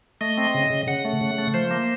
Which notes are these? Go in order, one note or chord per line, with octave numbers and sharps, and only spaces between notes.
A3 D#5
C4
C#3
C#3
C#3 F#5
A3
C#3
A3
F3 C5
A#3